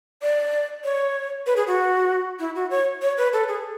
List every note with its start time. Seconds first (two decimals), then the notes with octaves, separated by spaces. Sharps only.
0.22 D5
0.84 C#5
1.47 B4
1.56 G#4
1.67 F#4
2.40 E4
2.55 F#4
2.71 C#5
3.02 C#5
3.18 B4
3.33 A4
3.48 G#4